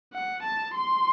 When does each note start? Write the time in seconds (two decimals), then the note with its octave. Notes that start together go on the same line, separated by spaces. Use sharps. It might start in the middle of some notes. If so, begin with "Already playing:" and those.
0.14 F#5
0.43 A5
0.75 C6